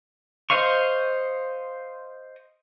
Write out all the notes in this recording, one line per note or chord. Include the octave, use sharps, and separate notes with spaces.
C5 D#5 F5 C#6